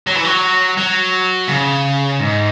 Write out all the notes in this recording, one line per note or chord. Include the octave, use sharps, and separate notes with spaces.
F#3
E3
F#3
F#3
C#3
G#2